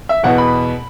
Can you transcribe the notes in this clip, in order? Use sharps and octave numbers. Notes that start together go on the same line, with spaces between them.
E5
E2 B2 B3 F#5
B5